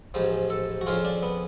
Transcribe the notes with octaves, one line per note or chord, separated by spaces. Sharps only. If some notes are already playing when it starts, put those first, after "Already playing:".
A1 G#2 F3
A4
F#4
F2 C#3 F3 F4
D4
B3